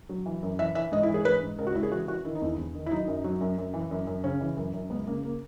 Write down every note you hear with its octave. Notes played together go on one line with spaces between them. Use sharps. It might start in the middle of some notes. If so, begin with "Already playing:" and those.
F#3
E3
F#2
E3 E5
E3 E5
G#2 D#5
E4
E3
G#4
G#2 B4
G#2
C#2 A#4
F#4
C#2 E4
G#4
E3 F#4
E3 F#4
D#3 E4
D#4
E2 E4
E2
D#3
E4
F#3 D#4
F#2
F#3
F#2
F#2
E3
F#2
F#2
C#3 C#4
E3
F#2
F#2
C#2 B3
C#3 A#3
A#3